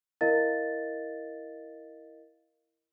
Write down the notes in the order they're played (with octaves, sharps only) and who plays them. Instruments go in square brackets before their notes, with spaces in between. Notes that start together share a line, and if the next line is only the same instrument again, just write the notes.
[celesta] E4 A#4 D#5 F5 A6